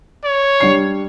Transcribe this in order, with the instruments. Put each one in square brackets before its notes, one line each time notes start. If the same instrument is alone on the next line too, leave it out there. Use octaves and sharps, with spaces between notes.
[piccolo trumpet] C#5
[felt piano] G3 D4 C7